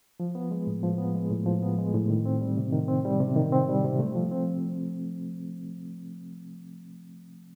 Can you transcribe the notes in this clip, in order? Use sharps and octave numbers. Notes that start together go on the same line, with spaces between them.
F3
B3
G#3
A2
F3
B3
G#3
A2
F3
B3
G#3
A2
D#3
C4
G3
C3
D#3
C4
G3
C3
D#3
C4
G3
C3
A3
F3
C4